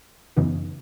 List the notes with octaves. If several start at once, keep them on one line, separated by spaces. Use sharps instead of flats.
F#2 C#3 E3 B3 D#4